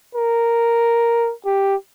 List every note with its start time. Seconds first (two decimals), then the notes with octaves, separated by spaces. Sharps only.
0.15 A#4
1.46 G4